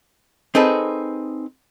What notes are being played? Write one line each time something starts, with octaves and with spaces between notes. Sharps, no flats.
C4 D#4 G#4 A4 B4